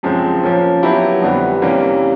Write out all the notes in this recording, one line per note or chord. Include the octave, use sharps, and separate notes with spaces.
F#2 C#3 F3 G#3 C4
F3 A#3 C#4
F#3 B3 E4 G4
F2 D3 G3 B3
C3 E3 G3 A#3 C#4